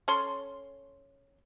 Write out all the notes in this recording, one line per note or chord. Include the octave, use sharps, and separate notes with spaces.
C#4 A4 C6